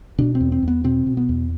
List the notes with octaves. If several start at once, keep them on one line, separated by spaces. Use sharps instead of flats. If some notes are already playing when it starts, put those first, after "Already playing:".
B2 D4
C4
E2
C4
E2
B3
B2 C4
B2
B3
E2